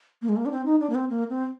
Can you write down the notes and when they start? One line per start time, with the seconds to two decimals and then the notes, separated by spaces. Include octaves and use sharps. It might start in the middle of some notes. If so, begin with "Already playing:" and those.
0.22 A#3
0.29 G#3
0.36 A#3
0.46 D4
0.52 C4
0.66 D#4
0.80 D4
0.90 A#3
0.95 C4
1.10 A#3
1.30 C4